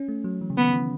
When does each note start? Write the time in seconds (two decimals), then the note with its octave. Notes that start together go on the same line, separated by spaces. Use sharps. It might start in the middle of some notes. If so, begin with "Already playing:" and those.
Already playing: C#4
0.08 A3
0.24 F#3
0.41 E3
0.50 C#3
0.57 D#3 B3
0.69 D#3
0.74 E3